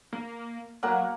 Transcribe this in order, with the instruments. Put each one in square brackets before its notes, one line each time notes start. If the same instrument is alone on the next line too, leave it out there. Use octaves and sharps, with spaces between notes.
[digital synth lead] A#3
[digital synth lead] F#3 [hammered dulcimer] A#3 A#4 F#5